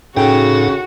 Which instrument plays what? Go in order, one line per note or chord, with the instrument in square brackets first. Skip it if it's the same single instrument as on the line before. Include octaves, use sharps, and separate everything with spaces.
[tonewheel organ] A2 D#4 A4 [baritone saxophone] C#3 [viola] F#4 [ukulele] G5